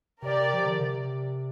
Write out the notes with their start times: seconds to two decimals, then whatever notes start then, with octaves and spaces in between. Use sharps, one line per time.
0.22 C3 G4 A#4 D5
0.54 F3
0.67 D3
0.80 C3